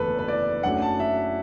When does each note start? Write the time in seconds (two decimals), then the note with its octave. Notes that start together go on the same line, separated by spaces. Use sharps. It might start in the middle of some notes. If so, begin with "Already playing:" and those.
Already playing: F#1 E2 D3 A3 A4 B4
0.19 B4
0.28 D5
0.63 F#2 F#3 A3 D4 F#5
0.82 A5
1.00 E5